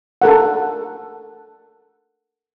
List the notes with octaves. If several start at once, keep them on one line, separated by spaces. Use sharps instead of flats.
A4 A#4 F#5